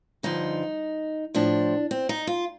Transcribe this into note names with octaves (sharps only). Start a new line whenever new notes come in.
G2 D3 F3 D#4
A2 F3 D4
C4
D#4
F4